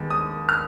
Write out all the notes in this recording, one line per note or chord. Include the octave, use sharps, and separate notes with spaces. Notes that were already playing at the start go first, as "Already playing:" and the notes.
Already playing: D#2 D#3 G#3 B3
D#6
F6